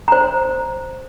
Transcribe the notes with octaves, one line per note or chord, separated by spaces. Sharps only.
C5 A#5